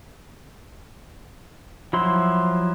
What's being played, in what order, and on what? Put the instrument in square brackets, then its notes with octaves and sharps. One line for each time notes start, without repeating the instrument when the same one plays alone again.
[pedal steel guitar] F3 F#3 E4 C6